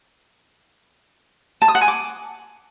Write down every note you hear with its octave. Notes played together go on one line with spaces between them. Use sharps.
A5
D#6
F#5
G#5
D6